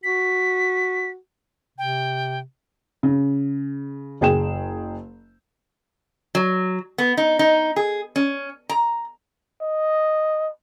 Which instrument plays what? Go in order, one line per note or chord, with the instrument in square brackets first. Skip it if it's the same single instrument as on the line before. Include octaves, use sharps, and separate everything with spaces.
[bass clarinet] F#4 [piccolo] B6
[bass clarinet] C3 [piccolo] G5
[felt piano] C#3
F#1 G#4 G5 E7
[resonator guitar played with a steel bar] F#3
B3
D#4
D#4
G#4
C#4
A#5
[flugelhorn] D#5